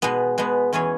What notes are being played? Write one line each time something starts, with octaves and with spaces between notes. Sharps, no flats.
B2 G#3 B3
B2 G#3 B3
E2 E3 C#4 G#4 C#5